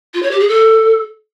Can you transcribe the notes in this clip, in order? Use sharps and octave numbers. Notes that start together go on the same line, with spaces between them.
F4
C#5
G4
G#4
A4